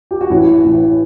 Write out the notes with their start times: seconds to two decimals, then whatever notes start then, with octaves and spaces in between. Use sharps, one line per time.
0.11 G4
0.21 F#4
0.30 A1 E3 E4
0.65 A2 E3